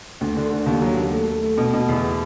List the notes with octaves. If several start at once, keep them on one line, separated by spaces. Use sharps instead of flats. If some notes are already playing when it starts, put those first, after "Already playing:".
D2
D3
D3
D#2
F#3
D#2
A3
A3
A3
B2
B2
E2